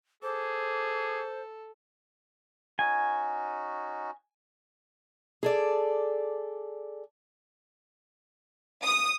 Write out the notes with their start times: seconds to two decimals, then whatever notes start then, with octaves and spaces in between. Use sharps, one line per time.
0.23 G#4 A4 C5 D6
2.79 C#4 D#4 F#4 G#5
5.43 G#4 A4 D5
8.83 D#6